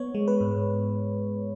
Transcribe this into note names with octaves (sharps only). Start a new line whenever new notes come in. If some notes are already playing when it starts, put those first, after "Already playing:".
Already playing: B3 C#5
G#3
B4
G#2